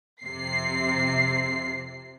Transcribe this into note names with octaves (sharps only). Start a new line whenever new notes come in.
F2 C3 C7